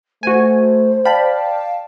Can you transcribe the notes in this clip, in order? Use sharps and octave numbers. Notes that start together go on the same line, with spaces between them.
A3 F#4 C5 G#5
D5 F5 G5 A5 B5